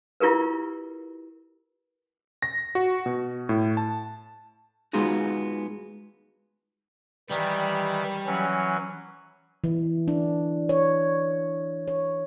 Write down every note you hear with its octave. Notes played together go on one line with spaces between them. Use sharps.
E4 F4 G4 A#4 B4
A#6
F#4
B2
A2
A5
G#3 B3 D#4 F4 F#4 G#4
D#3 E3 G3
E3 F#3 C#4
E3
D4
C#5
C#5